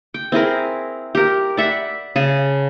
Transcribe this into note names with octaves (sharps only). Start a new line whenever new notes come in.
G5
C4 E4 G#4 A#4
G4 A#4
D5 E5 F#5 B5
C#3 G#4 A5